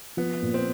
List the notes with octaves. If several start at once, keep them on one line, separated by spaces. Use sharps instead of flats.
F3 B3
A#2
C4